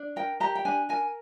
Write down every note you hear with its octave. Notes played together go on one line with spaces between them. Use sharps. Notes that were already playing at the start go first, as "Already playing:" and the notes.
Already playing: D4
A#4 G5
G4 A#5
G5
D4 G#5
A#4 G#5